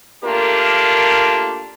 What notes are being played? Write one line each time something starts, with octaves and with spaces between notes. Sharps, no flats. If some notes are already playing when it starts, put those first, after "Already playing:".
A3 A#3 D4 F4 G4 A#4